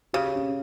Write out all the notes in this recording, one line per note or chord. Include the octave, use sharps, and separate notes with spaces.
C#3 G4
C#4